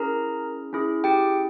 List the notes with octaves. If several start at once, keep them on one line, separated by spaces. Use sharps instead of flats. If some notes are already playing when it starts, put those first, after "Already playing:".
Already playing: C#4 E4 G#4 A#4 A#5
C#4 E4 G#4
G4 G5